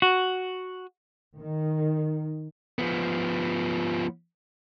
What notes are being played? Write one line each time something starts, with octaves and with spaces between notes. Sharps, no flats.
F#4
D#3
F3 B3